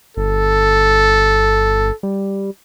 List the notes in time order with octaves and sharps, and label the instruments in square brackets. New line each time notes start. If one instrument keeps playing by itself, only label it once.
[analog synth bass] G1 [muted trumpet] A4
[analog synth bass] G3